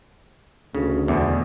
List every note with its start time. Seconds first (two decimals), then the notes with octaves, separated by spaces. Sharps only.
0.75 D2 C#3
1.08 E2 B2